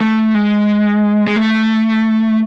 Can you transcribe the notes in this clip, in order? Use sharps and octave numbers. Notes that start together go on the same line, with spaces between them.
A3
G#3
G#3
A3